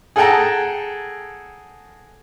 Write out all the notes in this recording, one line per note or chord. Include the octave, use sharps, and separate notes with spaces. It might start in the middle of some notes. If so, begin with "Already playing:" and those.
G#4 A4 F#5 G5 A5 A#5